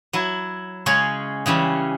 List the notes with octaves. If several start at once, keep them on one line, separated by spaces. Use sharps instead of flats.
F#3 E4
C#3 G#3 C#4 C#5
C#3 E3 G3 C#4